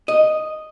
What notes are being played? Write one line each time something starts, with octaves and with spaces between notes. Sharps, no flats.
D#5